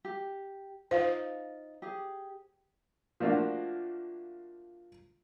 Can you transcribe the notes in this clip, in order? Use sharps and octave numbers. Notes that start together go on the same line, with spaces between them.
G4
D#4 F4 C5 F5
G4 G#4
F3 A3 A#3 D4 F4 F#4